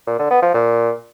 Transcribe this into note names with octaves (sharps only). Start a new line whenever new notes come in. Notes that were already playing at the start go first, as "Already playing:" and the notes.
A#2
D3
B3
F3
A#2